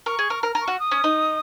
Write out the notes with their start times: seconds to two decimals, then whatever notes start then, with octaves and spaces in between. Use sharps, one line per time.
0.06 A#4 C#6
0.19 G#4
0.30 A#4
0.43 A#4
0.55 A#4
0.62 C#6
0.68 F#4
0.79 D#6
0.91 C#4
1.04 D#4